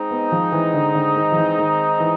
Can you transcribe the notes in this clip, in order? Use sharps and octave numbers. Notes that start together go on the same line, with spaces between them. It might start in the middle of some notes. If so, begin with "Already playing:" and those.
Already playing: G#3 C4 D#4
B3
F3
E3
D3
D3
D#3
F3
E3
D#3
E3